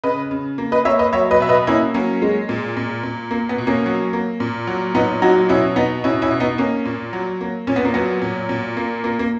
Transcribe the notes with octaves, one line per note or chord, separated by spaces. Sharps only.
C#3 B4 D#5
C#3
A#3
B4 D#5
A#3 C#5 E5
B4 D#5
F#3 C#5 E5
B4 D#5
B2 E5
B4 D#5
A#3 C#4 E4
F#3 A#3 C#4
G#3
A#2
A#2
A#2
A#3
B3
B2
A#3 C#4
F#3
A#3
A#2
F#3
A#2 B3 D#4
F#3 D#4 F#4
B2 C#4 E4
B2 B3 D#4
B2 C#4 E4
C#4 E4
B2
B3 D#4
A#3 C#4
A#2
F#3
A#3
A#2 C#4
B3
A#3
F#3 B3
A#2
A#2
A#3
A#3
A#3